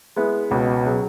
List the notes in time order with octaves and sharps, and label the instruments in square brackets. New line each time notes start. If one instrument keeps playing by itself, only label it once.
[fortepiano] G#3 B3 E4
[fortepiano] C#2 [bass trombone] B2
[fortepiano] C#3 F#3